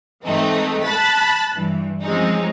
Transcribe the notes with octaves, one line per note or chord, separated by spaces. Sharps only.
G#2 E3 A3 C4 D#4
A5 B5 F#6 A6 B6
G2 E3
F3 G#3 C4 C#4 D#4